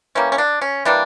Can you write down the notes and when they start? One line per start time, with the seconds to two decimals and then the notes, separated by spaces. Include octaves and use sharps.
0.15 E3 G3 A#3 C#4
0.32 C#4
0.38 D4
0.61 C#4
0.85 E3 G3 A#3 D4